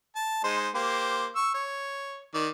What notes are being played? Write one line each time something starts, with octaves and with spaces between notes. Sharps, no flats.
A5
G#3 D#4 C5
A#3 G4 C5
C#6 E6
C#5
D#3 D5